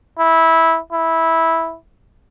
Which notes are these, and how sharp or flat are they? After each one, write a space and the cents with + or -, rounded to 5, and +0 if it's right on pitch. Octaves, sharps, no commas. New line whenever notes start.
E4 -15
E4 -10